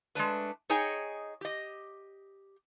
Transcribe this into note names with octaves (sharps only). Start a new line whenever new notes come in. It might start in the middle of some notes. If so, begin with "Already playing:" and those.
G#3 A3 D4 B4
D#4 G#4 C#5 D#5 G5 G#5
G4 D#5